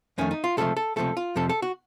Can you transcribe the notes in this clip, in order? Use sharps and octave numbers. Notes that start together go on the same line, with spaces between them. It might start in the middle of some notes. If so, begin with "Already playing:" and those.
F2 D#3 A3 C#4
D#4
F4
C#2 C3 F3 A3 A4
A4
C#2 C3 F3 A3 A4
F4
F2 C3 F3 A4
A4
F#4